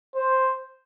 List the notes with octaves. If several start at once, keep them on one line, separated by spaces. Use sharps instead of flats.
C5